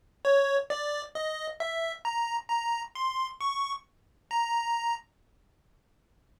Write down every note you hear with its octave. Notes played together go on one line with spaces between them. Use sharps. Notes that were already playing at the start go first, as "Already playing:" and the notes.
C#5
D5
D#5
E5
A#5
A#5
C6
C#6
A#5